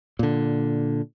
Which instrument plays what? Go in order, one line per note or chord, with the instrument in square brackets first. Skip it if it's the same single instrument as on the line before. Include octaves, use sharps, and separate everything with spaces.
[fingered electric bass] A#2 D3